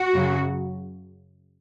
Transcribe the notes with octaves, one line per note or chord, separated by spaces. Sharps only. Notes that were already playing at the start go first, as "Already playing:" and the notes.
Already playing: F#4
F#2 C#3 F#3